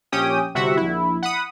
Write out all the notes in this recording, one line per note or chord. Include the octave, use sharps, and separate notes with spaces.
A#1 C#4 G4 G5 D#6
G1 C3 F#4 E5 F#5
A#1 E4
F#5 B5 D#6